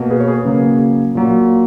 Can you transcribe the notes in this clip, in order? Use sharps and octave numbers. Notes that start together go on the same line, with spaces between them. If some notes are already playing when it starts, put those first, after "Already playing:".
Already playing: B2 A#3
G#4 B4
C#5
G#4 B4
C#3 F#3 A#3
A#2 F#3 A#3